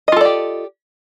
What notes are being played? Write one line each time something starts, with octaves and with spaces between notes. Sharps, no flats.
F4 G4 A4 D5 D#5